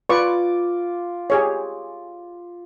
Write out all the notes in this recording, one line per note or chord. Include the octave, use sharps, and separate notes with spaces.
F4 B4 D5 C#6 D6
G4 G#4 C#5